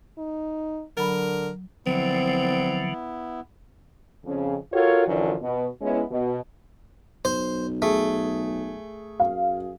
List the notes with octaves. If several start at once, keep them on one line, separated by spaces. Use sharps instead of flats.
D#4
D3 F#3 A#4 B5
D3 F3 F#3 B3 C4 E4
F2 C#3
F4 F#4 A4 A#4 C#5
F#2 D3 E3 F3 D4
B2
G#3 B3 C#4 E4
B2
B1 C5
A3 G#4
F#2 F5